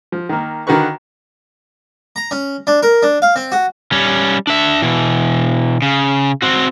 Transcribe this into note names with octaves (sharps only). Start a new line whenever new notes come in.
F3
D#3 A#3
D3 D#3 F#4 A#4 B4 C#6
A#5
C#4
D4
A#4
D4
F5
C4
F#4
G3 C#4
D4 E5
B2 E3
C#3
C4 F#4